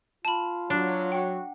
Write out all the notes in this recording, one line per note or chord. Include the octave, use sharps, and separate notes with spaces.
F4 A5 B5
F#3 D4
F#4 F#5 G5